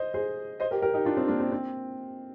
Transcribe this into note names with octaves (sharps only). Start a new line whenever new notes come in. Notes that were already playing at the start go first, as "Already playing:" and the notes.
Already playing: C5 D#5
G#4 C5
C5 D#5
G4 A#4
G4 A#4
D#4 G4
D4 F4
C4 D#4
A#3 D4
C4
C4